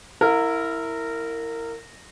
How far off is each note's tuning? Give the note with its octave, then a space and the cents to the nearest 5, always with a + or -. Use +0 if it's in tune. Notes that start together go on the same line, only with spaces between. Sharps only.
E4 +0 A#4 -20 F5 +45